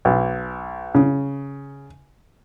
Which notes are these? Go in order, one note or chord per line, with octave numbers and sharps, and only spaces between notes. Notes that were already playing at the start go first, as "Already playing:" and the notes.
B1
C#3